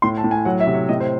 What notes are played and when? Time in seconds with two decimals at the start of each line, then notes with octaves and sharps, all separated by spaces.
0.02 A2 C6
0.18 A5
0.24 A2
0.31 G#5
0.45 F#3 F#5
0.60 E5
0.67 C3
0.74 C#5
0.89 A2 D#5
1.00 C5